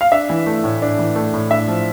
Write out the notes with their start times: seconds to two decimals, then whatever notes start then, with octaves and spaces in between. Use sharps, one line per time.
0.01 F5
0.12 D4 E5
0.30 E3
0.46 A3
0.64 A2
0.82 D4
0.99 E3
1.16 A3
1.33 A2
1.50 D4 E5
1.68 F3